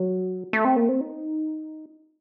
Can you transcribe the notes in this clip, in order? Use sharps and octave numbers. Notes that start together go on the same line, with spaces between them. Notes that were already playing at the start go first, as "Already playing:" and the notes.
Already playing: F#3
A3
C4
A#3
C4
D#4